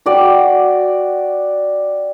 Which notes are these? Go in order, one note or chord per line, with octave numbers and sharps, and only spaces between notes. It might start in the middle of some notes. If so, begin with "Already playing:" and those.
F#4 D5 G5